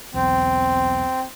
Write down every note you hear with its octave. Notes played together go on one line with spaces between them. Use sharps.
B1 E2 C4